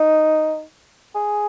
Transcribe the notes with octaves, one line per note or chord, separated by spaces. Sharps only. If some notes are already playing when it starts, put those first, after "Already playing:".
Already playing: D#4
G#4